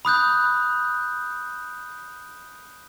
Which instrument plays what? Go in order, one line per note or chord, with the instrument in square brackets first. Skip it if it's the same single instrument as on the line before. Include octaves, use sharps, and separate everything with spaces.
[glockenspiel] B5 D#6 F#6 G6